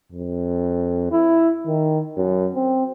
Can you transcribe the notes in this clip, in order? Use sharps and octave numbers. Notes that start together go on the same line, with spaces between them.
F2
E4
D#3
F#2
C4